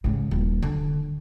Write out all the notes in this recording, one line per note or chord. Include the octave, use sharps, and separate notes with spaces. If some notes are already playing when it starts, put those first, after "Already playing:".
G#2 C#3
D#1
D3